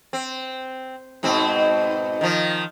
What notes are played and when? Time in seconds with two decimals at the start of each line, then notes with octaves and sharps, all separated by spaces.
0.13 C4
1.23 G#2 B2 C4
2.21 D#3 F3